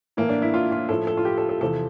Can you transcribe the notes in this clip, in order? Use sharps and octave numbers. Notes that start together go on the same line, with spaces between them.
A2 E3 A#3
D4
E4
F4
F4
A2 F3 A4
A4
F4
G4
A4
A4
E2 C3 F3 A4